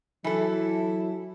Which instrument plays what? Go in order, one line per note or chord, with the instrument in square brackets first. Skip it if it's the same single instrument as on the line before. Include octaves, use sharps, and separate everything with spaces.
[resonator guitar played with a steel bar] E3 A4 [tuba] F#3 [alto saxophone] E4